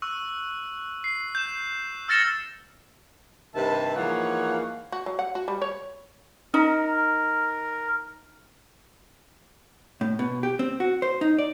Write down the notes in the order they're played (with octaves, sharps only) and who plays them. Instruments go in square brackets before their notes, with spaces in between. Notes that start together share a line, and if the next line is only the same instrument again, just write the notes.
[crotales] C#6 E6 F#6
C7
G6 E7
E6 F6 A6 A#6 C#7 E7
[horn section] G2 C3 D#3 B4 E5 A5
G#2 E3 F3 A#3 C#5 F#5
[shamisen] F#4
F#3
F#5
F#4
G3
C#5
[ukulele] D#4 [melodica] A#4
[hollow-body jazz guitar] A2
B2
G4
C4
F#4
C5
D#4
D5